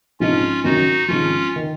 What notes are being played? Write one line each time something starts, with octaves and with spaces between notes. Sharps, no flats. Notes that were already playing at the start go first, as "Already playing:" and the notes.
A#1 G#2 F3 C4 C#4 D#4 F4
F#1 F#2 D#3 D#4 F#4
G#1 G#2 F3 C#4 F4
D#3